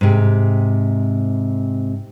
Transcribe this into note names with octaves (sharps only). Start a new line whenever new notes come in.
G#2 C3